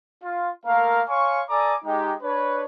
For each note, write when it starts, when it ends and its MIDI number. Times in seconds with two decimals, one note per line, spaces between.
0.23 0.49 65
0.66 1.01 57
0.66 1.01 58
0.66 1.01 70
0.66 1.01 77
1.08 1.40 73
1.08 1.40 77
1.08 1.40 80
1.08 1.40 84
1.08 1.40 85
1.49 1.74 69
1.49 1.74 74
1.49 1.74 80
1.49 1.74 82
1.49 1.74 86
1.49 1.74 87
1.85 2.12 56
1.85 2.12 63
1.85 2.12 67
2.22 2.65 62
2.22 2.65 71
2.22 2.65 73